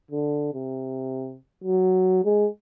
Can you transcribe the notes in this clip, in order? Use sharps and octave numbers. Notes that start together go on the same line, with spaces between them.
D3
C3
F#3
G#3